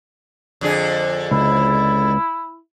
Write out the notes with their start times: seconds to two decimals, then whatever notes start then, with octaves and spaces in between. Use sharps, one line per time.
0.61 F2 D3 G#4
1.31 C#2 E4